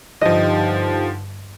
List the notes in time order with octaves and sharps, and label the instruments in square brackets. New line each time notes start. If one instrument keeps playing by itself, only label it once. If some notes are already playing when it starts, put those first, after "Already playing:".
[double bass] G2 [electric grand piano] D3 F3 [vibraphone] D#4 G4 G5 [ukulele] D#5